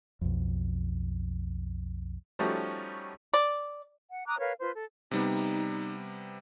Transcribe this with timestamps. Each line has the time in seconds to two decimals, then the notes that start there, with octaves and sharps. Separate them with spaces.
0.21 B1 F2
2.39 F3 G3 A3 C#4 D#4 F#4
3.34 D5
4.11 F#5
4.27 A#5 D6 D#6 F#6
4.39 A#4 B4 C#5 F5
4.60 F4 B4 C5
4.74 A4
5.11 C3 G3 B3 D#4